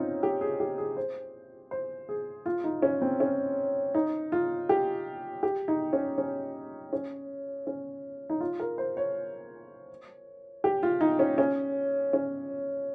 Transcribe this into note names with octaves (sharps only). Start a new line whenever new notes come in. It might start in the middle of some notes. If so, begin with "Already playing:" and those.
Already playing: C4 C#4 D#4 F4
G4
G#4
G4
G#4
C5
C5
G#4
F4
D#4
C#4
C4
C#4
D#4
F4
G4
G4
D#4
C#4
C#4
C#4
C#4
D#4
F4
A#4
C5
C#5
G4
F4
D#4
C#4
C#4
C#4